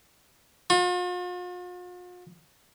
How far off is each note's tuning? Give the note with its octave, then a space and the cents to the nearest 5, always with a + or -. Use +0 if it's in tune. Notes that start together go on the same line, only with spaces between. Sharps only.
F4 +45